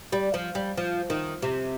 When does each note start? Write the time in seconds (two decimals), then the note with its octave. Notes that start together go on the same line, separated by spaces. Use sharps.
0.12 G3
0.34 F3
0.55 G3
0.77 F3
1.10 D#3
1.42 C3